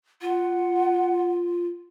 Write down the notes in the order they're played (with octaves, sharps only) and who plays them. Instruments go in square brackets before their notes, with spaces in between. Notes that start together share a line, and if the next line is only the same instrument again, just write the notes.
[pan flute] F4 [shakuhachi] F#5